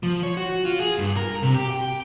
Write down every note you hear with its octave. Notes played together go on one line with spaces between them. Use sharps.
F3
C#5
F#4
F4
G#4
G2
A#4
C3
G4
G5